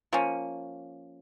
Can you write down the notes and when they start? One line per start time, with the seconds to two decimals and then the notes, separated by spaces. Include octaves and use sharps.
0.13 F3 A#3 C#4